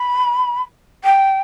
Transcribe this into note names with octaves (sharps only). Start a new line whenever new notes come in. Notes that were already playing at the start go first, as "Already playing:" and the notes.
Already playing: B5
G5